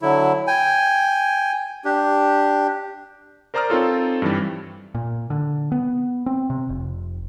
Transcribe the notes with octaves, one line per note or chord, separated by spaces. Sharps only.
D3 F#3 E4
G5 G#5
D4 G4
A#4 C5 D5 A#5 D#6 F6
C4 D#4 F4 A4 C#5
G2 E3 G3
A#2
D3
B3
C4
C3
F1